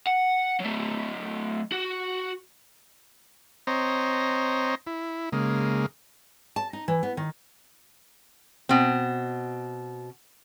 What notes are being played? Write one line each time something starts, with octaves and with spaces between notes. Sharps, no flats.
F#5
F#3 A3
F#4
C4 C5 C#5 D#5 A#5
E4
C#3 G#3 A#3
A5
D#4
E3
B3
D#3
B2 C4